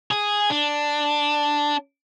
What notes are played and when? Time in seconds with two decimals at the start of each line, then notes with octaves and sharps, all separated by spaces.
0.11 G#4
0.50 D4